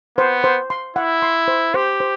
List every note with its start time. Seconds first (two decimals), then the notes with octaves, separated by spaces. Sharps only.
0.18 B3 C5
0.44 C5
0.70 C6
0.96 E4 F#5
1.22 C6
1.48 C5
1.74 G4 C5
2.00 C5